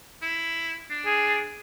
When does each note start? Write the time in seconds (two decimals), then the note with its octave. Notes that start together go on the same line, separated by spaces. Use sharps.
0.22 E4
0.90 D4
1.06 G#4